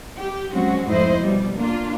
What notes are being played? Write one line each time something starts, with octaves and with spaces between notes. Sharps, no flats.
G4
F3 F#3 G#3 C4 C#4 F#4
F2 G#2 A3 E4 C5 D#5
B2 G3
A#3 D4 F4